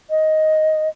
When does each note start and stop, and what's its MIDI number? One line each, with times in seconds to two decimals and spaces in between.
0.10 0.89 75